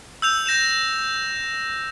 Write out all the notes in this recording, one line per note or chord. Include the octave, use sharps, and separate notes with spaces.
E6 G6 F7
G6 A#6 E7 F7